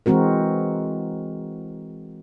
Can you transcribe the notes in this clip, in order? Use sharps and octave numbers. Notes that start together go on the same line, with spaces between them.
E3 G#3 C4 F#4 A#4